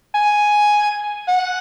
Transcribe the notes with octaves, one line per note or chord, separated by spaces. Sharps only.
G#5
F#5